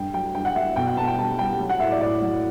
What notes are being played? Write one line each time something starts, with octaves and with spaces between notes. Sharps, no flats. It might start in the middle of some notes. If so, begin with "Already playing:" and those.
Already playing: G2 G5
F#3 G5
G2 G5
F#5
F#3 E5
B2 G5
F#5
B2 A5
G5
G3 A5
G3 G5
F#3
F#5
A2 E5
D5
A2 D5
F#3